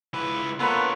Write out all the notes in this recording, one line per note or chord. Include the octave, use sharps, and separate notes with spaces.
C#2 E4 B4
A#3 B3 F4 A4 B4 C#5